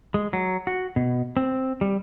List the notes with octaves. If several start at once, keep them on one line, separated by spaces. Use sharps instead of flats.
G#3
F#3
F#4
B2
C4
G3